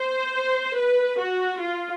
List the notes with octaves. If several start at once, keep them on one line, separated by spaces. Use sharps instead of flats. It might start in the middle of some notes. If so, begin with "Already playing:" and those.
Already playing: C5
B4
F#4
F4